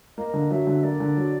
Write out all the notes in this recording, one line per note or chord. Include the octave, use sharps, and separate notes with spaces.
A#3 D#5
D3
F#3 E5
D3
A#3 D5
D3
F#3